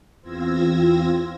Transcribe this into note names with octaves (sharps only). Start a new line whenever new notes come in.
E2 C4 F4 E6 G#6 A#6